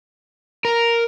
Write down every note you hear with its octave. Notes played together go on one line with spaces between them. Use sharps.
A#4